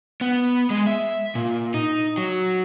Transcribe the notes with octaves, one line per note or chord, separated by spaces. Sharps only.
B3
G#3
E5
A#2
D#4
F#3